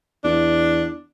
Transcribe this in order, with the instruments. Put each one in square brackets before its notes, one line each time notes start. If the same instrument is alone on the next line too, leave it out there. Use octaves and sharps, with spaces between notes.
[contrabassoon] E2 [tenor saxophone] D4